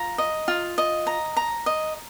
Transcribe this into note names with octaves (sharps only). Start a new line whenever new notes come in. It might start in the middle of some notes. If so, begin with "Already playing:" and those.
Already playing: F4 A#5
D#5
F4
D#5
A#5
A#5
D#5